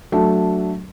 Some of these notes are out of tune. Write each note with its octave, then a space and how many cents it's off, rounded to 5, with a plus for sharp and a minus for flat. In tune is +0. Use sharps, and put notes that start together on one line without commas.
F#3 +0 A3 +0 D4 -10